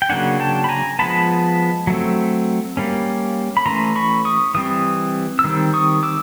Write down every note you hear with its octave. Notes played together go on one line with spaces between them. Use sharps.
G5
C#3 F#3 A#3 D4 F#5 G#5
G5 A5
B5
G#5 A#5
F3 G#3 B3 A5 B5
F#3 A3 C4
G3 A#3 C#4
B5
E3 A3 C#4 A#5 C6
B5 C#6
C#6 D#6
E3 G3 C4 D#6
E6
D#3 G3 C4
C#6 D#6
D6 E6